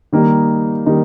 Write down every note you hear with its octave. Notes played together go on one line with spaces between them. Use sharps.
D#3 G3 A#3 D#4
D#3 G3 A#3 D#4